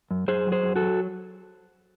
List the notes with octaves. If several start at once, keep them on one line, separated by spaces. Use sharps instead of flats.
F#2
F#2 G#4 C5
F#3
G#4 C5
F#2
F#4 A4
F#3